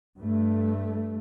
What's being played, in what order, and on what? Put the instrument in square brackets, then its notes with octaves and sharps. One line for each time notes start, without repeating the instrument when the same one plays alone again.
[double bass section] G2 A3